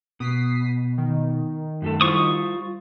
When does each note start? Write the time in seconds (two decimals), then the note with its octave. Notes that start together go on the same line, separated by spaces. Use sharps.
0.20 B2 D#6 B6 C7
0.98 D#3
1.82 F#2 A3 A4
2.01 G3 E4 F4 C5 C#6 D#6